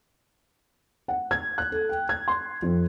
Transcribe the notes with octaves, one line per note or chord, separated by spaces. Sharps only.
F#5
G#6
F#6
A4
G5
G#6
C6
F2